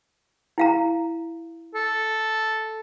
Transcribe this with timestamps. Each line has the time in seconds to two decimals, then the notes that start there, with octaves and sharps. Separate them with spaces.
0.58 E4 F5 A#5
1.75 A4